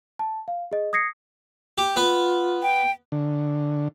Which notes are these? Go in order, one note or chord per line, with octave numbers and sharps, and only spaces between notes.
A5
F5
G#4 D#5
D#6 G#6 A#6 C7 C#7
G4
B3 F4 B4
G5
D3